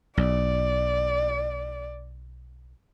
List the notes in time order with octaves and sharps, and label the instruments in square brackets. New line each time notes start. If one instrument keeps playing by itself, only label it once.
[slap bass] B1 [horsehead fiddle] D5